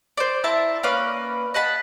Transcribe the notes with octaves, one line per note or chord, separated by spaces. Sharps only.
C5 D5
E4 E5 A5 A#5
A#3 C#4 B4 D5
D#5 F#5 A5 B5